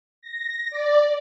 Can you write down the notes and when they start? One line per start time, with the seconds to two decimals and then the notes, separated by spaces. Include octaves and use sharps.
0.22 A#6
0.70 D5